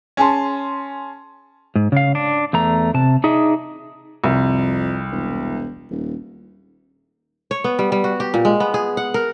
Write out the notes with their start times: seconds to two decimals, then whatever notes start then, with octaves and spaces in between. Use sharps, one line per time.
0.17 C#4 G#4 G#5 A5 C6
1.75 G#2
1.92 C#3 F5
2.15 D4
2.53 E2 A3 A#5
2.94 C3 A5
3.24 D4 D#4 G#4 D#5 E5
4.24 C2 F2
5.12 E1
5.90 D#1
7.51 C#5
7.64 B3
7.79 G3
7.92 G3
8.04 F#4
8.20 G4
8.34 A#2
8.45 G#3
8.60 B3
8.74 G#4
8.97 F#5
9.14 A#4